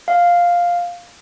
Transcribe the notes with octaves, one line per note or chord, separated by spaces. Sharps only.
F5